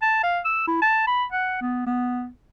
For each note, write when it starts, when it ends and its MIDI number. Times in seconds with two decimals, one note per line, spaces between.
0.02 0.20 81
0.23 0.40 77
0.45 0.67 88
0.67 0.81 64
0.82 1.06 81
1.07 1.25 83
1.32 1.58 78
1.61 1.83 59
1.87 2.27 59